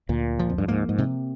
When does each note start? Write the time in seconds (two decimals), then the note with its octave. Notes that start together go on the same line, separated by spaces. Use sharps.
0.09 D2 A#2
0.39 F3
0.49 F2
0.58 G2
0.68 G#2 A#3
0.89 G#2
0.98 C3